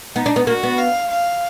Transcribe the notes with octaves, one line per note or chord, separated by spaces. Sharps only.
B3 D#4
D4
B3
A#3 F#4
B3
F5
F5